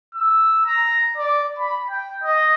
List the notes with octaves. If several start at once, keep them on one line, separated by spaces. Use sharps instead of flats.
E6
A#5
D5
B5
G5
D#5